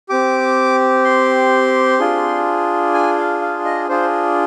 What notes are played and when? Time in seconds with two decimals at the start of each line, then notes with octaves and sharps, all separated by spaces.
0.09 C4 G4 D6
1.05 C6
1.99 D4 F4 G#4
2.94 G#5
3.18 F5
3.41 F5
3.65 D#5
3.89 D4 F4 G#4 C5